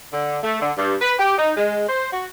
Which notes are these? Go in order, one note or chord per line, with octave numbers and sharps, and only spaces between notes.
D3
A3
D3
G2
B4
G4
D#4
G#3
C5
F#4